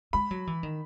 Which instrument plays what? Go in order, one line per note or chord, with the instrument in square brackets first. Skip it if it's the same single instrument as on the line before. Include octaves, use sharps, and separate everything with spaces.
[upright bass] G#3 [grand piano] B5
[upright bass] F#3
E3
D#3